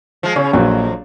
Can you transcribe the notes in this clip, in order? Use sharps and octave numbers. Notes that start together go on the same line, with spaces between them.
F3 G#3
C#3 C#4
A#1 F2 F#3